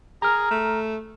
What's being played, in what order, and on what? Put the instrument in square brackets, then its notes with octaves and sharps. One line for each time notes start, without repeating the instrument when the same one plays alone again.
[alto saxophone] G#4 [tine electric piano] A#5 F6
[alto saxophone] A3